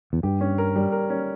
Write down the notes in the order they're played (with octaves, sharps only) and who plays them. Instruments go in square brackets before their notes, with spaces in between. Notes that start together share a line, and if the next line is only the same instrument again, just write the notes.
[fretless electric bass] E2
[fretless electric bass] G2 [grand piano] G4
[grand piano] C#4
A#4
G3
A#4
C#4